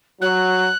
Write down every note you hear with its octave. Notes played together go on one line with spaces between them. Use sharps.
F#3 F#6